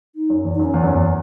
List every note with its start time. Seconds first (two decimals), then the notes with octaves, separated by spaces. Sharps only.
0.15 D#4
0.30 F#2
0.44 E2
0.55 D#4
0.59 F#2
0.65 C#4
0.74 E2 B3
0.84 F#2
0.94 E2